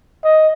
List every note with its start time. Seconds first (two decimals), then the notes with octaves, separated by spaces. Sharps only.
0.24 D#5